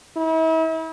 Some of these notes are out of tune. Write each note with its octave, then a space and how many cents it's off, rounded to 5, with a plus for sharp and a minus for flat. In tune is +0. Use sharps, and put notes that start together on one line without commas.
E4 -40